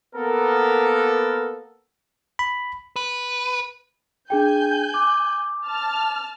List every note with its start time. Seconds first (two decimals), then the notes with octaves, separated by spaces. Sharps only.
0.15 A#3 B3 A4 A#4
2.39 B5
2.96 B4
4.30 D4 G#4 G5 G#5 G6
4.94 D6
5.67 A5 F6